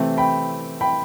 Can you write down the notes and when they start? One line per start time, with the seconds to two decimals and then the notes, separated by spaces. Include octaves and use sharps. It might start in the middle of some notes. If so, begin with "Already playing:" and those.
Already playing: C3 E3 A3 C4
0.17 G5 B5
0.81 G5 B5